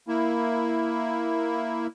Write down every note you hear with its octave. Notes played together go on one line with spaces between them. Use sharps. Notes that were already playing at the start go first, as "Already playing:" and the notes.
A#3 E4